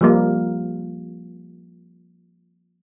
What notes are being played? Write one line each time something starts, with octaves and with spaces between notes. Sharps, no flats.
F3 G3 A#3